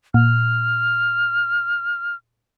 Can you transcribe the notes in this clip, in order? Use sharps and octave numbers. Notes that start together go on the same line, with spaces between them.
A#2 F6